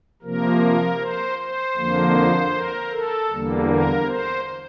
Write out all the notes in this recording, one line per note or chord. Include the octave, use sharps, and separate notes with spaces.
C3 F3 A#3 A#4
C5
C5
F2 D3 F3 A#3
A#4
A4
E2 D3 G3 A#3
A#4
C5